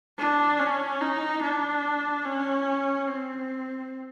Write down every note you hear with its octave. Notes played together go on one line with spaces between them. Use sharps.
D4
C#4
D#4
D4
C#4
C4